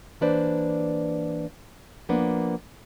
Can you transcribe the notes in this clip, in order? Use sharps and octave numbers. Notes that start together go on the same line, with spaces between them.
E3 A#3 D4 B4 C5 D5
F3 A#3 B3 D4